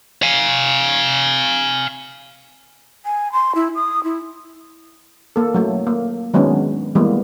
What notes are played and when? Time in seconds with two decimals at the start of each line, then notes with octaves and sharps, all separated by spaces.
0.23 F5 G#5
3.04 G#5
3.33 C6
3.55 E4
3.75 D#6
4.04 E4
5.36 A#3 A4
5.54 F#3 A3
5.87 A#3
6.34 D#3 F#3 G#3 B3 C#4 D4
6.95 E3 G3 G#3 A#3 B3